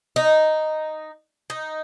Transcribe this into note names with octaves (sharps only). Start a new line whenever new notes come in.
D#4
D#4